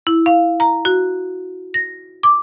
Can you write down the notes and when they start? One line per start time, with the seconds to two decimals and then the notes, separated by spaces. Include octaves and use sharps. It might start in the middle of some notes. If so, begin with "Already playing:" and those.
0.07 E4
0.26 F5
0.60 A#5
0.85 F#4
1.74 A#6
2.23 D6